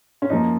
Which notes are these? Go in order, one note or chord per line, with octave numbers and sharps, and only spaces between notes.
C#4
F#2 F3 A#3 D#4